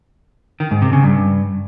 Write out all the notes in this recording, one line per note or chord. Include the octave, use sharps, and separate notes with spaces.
D#3
G#2
C3
C#3
G2